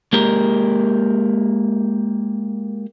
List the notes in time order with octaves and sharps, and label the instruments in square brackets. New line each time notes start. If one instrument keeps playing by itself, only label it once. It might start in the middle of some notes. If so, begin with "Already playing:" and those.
[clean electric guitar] G#3 A#3 G4 A#4